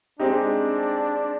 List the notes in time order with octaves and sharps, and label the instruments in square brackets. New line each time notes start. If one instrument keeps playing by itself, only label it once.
[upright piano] G#3 C4 D#4 G4 [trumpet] D4